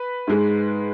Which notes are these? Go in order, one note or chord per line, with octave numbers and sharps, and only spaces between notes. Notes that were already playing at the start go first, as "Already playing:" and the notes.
Already playing: B4
G#2 G#3